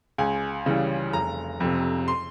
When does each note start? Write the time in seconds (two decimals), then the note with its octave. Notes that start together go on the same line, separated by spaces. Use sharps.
0.18 C#2 G#5
0.66 C#3 E3 G3
1.13 F1 A#5
1.60 F2 C3
2.08 C6